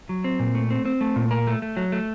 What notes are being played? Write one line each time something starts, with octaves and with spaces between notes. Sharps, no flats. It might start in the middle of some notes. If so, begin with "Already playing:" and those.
F#3
C4
A#2
A3
C4
C4
A3
A#2
A#4
A3
A3
F#3
A3